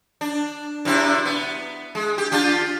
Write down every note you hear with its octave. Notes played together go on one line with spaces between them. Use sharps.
D4
F#2 C3 E4
B3
G#3
G4
D4 F4 G4